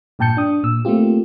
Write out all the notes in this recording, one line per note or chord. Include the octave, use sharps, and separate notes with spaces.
G2 A#2 G5 A5 G6 C#7
D4 D#6
A#2 E6
A3 A#3 C4 F4 G4